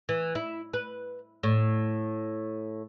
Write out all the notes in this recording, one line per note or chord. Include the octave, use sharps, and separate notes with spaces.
E3
E4
B4
A2